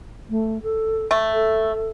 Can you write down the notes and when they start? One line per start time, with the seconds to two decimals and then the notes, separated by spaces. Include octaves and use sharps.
0.30 A3
0.63 A4
1.11 A3
1.34 A4